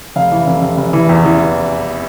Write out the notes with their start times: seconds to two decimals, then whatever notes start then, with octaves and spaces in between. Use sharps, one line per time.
0.16 F1 F5
0.31 E3
0.47 F1
0.62 F1
0.77 F1
0.93 E3
1.09 E2
1.25 E3